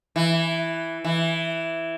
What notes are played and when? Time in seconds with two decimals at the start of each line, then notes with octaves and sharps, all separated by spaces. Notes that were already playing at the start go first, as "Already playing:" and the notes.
0.16 E3
1.04 E3